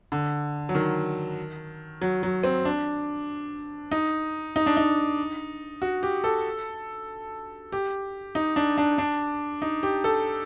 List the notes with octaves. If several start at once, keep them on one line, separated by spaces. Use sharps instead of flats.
D3
F#3
D#3
F#3
F#3
C4
D4
D#4
D#4
D4
D#4
F#4
G4
A4
G4
D#4
D4
D4
D4
D#4
G4
A4